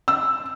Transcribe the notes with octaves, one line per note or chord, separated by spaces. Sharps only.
E6